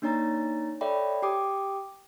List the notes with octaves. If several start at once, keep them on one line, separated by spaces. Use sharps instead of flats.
A#3 D4 D#4 C#5 A#5 A6
A4 C#5 D5 E5 G5 B5
G4 G5 D6 D#6